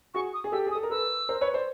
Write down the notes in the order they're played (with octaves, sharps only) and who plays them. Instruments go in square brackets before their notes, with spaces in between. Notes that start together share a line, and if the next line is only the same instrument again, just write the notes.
[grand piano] F#4 G#4 [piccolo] C#6
[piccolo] D#6
[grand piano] G#4
[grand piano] G4 A4 [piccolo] E6
[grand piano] G#4
[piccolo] D#6
[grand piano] A4
A#4
[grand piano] A4 B4 [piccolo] E6
[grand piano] A#4 C5
B4 C#5
C5 D5